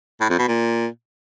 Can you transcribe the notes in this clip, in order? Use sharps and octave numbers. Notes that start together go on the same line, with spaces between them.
A2
F2
B2
A#2